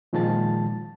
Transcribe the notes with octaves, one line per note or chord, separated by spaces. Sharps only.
A#2 D#3 F3 G#3 A5 A6